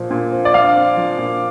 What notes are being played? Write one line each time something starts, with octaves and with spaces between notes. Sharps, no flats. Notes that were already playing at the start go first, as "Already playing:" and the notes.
Already playing: A#2 F3
A#2
C4
D5
F3 F5
C4
F3
A#2